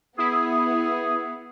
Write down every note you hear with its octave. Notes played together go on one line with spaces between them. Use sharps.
B3 E4 G#4 D#6